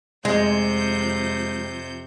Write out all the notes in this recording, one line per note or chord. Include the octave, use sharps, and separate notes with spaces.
F2 C3 G#3 G6